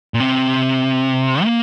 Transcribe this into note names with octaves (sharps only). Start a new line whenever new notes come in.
A#2
C3
A#3